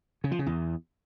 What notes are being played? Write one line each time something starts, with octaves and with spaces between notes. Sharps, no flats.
C#3
F3
C#3
E2